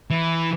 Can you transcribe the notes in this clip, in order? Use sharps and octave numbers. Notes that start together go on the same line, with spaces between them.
E3